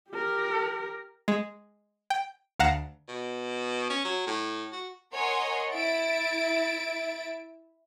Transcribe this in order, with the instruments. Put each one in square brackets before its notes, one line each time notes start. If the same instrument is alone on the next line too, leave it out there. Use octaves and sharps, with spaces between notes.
[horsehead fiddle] G4 A#4
[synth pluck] G#3
G5
D2 F5 F#5 A#5 E7
[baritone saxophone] B2
C#4
F#3
A2
F#4
[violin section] A#4 C#5 D#5 F#5 G#5 C6
E4 E5 A6 D7